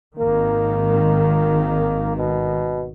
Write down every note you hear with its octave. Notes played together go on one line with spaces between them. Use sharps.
G#1 D#3 A#3
B2